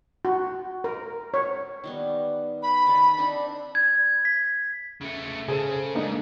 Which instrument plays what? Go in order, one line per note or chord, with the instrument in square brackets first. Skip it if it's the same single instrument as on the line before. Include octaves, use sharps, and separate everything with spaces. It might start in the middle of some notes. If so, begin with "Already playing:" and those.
[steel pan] F#4
A#4
C#5
[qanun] D#3 G3 B3
[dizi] B5
[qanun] D#3 A4
C4 D4 D#4
[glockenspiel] G#6
B6
[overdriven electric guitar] C#3 A3
[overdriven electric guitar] C#3 [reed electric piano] G#4 A4 C5
[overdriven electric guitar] D#2 G#2 [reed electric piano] A#3 D4 D#4